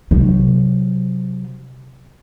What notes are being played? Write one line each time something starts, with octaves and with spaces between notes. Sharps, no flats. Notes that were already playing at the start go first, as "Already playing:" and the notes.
C3 F#3